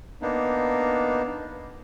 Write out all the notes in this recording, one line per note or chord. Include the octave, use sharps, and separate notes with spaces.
A#3 B3 D4 D#4